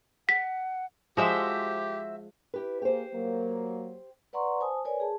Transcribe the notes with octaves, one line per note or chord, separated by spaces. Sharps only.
F#5 B6
F3 G#3 F#4 G4 C5 E5
E4 G4 B4
A#3 G4 G#4 C5
F#3 A#3
B4 D5 F#5 A#5 C6 C#6
C5 G#5 A5 D#6
A#4 B4 C#5 D5 G#5
G#4 A5